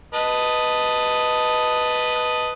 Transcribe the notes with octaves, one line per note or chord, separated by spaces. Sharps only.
B4 D#5 A5